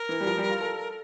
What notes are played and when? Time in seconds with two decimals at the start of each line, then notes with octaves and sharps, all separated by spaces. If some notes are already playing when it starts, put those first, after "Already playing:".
Already playing: A#4
0.09 E3
0.20 G3
0.27 F3
0.38 G3
0.50 F4
0.61 A4